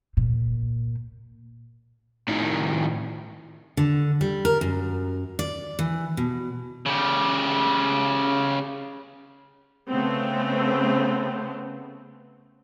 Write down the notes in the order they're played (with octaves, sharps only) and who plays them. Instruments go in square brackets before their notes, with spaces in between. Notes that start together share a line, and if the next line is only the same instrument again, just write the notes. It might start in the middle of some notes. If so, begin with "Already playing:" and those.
[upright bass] A#2
[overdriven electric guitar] A2 D#3
[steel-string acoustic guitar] D3
G3
A#4
F#2
D5
E3
B2
[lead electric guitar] C#3 G4
[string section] C#3 A3 B3 C4